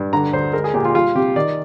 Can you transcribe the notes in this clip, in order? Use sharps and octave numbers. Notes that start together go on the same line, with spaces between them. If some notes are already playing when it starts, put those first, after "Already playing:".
Already playing: G2
D3 A#5
D2 C5
G#3 A#4
G#4
A#2 G4
F4
G3 F4
C3 G4
D#3 D5